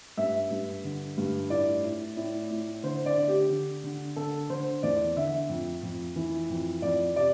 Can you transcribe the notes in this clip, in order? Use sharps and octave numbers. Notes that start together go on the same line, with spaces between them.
G2 E5
G2
D3
G2
A2 D5
A2
A2
A2
D3 C5
D5
D3
G4
D3
D3
D3 A4
D3 C5
E2 D5
D3 E5
F2
F2
E3
F2
F2 D5
C3 D5